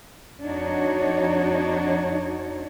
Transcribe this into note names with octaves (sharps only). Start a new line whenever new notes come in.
F2 D4 D#4 F#4 C#5